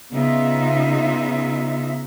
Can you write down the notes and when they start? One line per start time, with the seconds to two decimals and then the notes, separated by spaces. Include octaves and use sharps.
0.10 C#3 B3 D#4 F4 E5